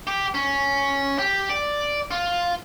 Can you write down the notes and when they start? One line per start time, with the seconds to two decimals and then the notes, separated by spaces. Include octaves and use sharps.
0.07 G4
0.34 C#4
1.18 G4
1.49 D5
2.11 F4